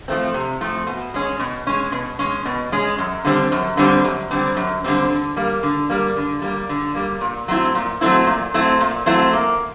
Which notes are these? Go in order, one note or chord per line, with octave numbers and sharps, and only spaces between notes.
F3 A3 C4
C3
F3 A3 C4
B2
G#3 C#4
B2
G#3 C#4
B2
G#3 C#4
B2
G#3 C#4
F#2
D3 G3 C4
F#2
D3 G3 C4
F#2
D3 G3 C4
F#2
D3 G3 C4
D3
G3 A#3
D3
G3 A#3
D3
G3 A#3
D3
G3 A#3
A#2
F#3 A3 C4 E4
A#2
F#3 A3 C4 E4
A#2
F#3 A3 C4 E4
A#2
F#3 A3 C4 E4
A#3